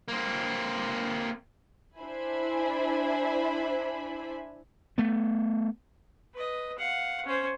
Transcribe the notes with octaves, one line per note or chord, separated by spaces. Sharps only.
A#3 C4
D4 E4 C5 E5 G#5 B5
A3 B3
B4 D#5
F5 F#5
C#4 C5